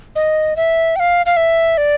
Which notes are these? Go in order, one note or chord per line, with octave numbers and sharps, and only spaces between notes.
D#5
E5
G5
F5
F5
E5
D5